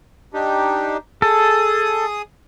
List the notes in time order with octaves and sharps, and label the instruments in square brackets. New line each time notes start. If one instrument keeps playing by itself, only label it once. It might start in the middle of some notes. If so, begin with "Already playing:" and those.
[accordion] D4 D#4 G4
[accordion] G#4 D#6 [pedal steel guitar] A4